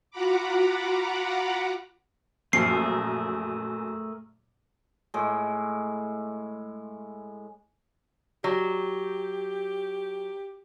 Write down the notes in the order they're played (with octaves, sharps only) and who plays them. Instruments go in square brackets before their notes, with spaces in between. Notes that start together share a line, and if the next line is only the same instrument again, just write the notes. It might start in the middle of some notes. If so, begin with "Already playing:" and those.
[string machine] F4 F#4 F#5 A#5 B5 D6
[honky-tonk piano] F#2 A#2 F3 [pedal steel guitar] A3 G#4 A#4 [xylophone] C7
[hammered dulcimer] A2 G#3
[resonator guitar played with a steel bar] F#3 [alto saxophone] G4